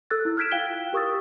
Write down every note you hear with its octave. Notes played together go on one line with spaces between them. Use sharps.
A4 E6 F#6 A6
E4
F6 F#6 G#6 B6 D7 E7
F4 F5 G5 G#6 D7 G7
G4 A#4 C#6 D#6 E6 A6